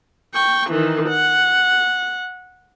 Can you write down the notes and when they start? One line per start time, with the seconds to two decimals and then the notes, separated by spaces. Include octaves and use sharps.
0.34 G5 C#6
0.70 D#3 E3
1.09 F#5